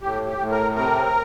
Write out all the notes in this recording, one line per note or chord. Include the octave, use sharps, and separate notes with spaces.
A2 G4
G4
A2
A#4
C3 A#4